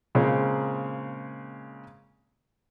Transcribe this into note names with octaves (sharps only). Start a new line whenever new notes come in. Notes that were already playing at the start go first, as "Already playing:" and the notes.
A#2 C#3 G#3 A#3 C4